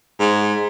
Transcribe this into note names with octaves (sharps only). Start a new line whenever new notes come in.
G#2